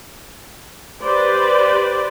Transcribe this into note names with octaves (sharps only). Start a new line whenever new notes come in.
G4 B4 C5 D5